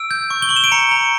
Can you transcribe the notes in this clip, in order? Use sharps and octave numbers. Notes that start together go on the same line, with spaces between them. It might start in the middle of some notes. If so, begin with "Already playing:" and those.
Already playing: E6 D7
G6
C#6
G7
C#6 F#7
E7
D7
A#5 C#7
A#5